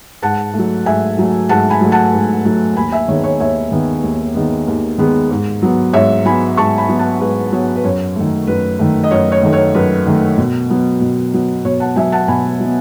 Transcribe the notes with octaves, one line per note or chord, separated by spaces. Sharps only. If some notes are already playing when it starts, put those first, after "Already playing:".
G#2 F#5 A5
F#3 A3
G#2 E5 G#5
F#3 A3
G#2 F#5 A5
G#5 B5
F#3 A3
F#5 A5
G#2
F#3 A3
D#2 G#5 B5
E5 G#5
D#3 G#3 B3 C#5
C#5
D#2 C#5 E5
D#3 G#3 B3
D#2
D#3 G#3 B3
D#2
D#3 G#3 B3
G#2
F#3 B3
G#2 C#5 E5
F#3 B3 G#5 B5
G#2 A5 C#6
G#5 B5
F#3 B3
F#5 A5
G#2 B4
F#3 B3 C#5
B4
F#2 C#5
D#3 A3
F#2 B4
D#3 A3
D#5
F#2 C#5
C#5
D#3 A3
C#5
F#2 B4
D#3 A3
B2
F#3 B3
B2
F#3 B3
B2 C#5
F#5 A5
F#3 B3 E5 G#5
F#5 A5
B2 G#5 B5
F#3
B3